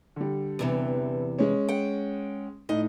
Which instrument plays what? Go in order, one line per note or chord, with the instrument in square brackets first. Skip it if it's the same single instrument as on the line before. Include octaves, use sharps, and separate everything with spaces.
[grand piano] D3 G3
[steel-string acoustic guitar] E2 C3 E3
[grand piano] G#3 C#4
[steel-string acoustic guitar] F#5 G5
[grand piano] A2 D#4 [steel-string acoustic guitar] D#5